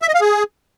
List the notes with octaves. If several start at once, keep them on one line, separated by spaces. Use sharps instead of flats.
E5
D#5
F5
G#4